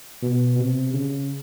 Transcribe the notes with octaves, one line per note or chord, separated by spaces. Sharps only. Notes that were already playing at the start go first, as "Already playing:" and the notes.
B2
C3
C#3